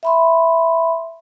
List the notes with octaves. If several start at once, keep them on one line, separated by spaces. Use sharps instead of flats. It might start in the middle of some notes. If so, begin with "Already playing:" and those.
E5 B5 C6